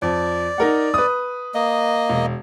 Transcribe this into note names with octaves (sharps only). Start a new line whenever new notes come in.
F2 D5
D#4 A#4 F#5
B4 D#6
A#3 D#5
E1